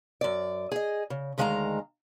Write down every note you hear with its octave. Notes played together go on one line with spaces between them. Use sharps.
F#2 A#2 D5
G#4 D#5
C#3
D2 D#3 G#3 F5 A5 A#5